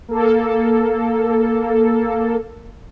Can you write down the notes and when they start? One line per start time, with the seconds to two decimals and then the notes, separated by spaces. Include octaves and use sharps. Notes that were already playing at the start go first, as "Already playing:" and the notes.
0.08 A#3 A4